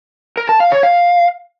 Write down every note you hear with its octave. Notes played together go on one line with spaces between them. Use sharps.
A#4
A5
F5
C#5
F5